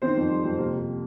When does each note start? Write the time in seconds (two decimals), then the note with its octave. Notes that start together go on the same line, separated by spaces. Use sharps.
0.02 D#3 C4 C5
0.17 F2
0.30 G3
0.44 F2
0.58 C3 A#3 A#4
0.73 C3